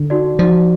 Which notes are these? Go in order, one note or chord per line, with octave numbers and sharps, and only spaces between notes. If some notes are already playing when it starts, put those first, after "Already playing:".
Already playing: D3
D#4 F#4 D5
F3 D#4 F#4 D5